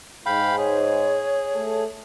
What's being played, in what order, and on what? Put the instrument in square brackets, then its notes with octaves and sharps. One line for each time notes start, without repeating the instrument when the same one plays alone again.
[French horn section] G#2 [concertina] F5 G5 B5
[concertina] G#4 [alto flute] C#5
[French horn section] A3 A4